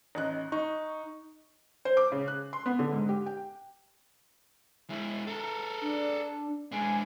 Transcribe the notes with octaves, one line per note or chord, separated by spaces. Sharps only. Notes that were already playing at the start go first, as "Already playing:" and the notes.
A1 D#4 F#6
D#4 C#6
C5
D6
C#3
F#6
C6
B3
D3
G#2
G4
G5
G#3 E4
A4 A#4
D4
G#3 D4 G#5